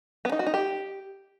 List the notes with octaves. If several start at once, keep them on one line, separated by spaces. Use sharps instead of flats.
B3
D#4
F#4
D#4
G4